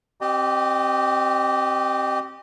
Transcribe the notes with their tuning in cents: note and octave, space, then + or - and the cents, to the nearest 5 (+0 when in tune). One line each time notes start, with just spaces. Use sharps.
C4 +25 G4 -20 D#5 -30